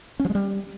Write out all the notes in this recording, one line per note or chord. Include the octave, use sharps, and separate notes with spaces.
C#4
F3
G#3
G3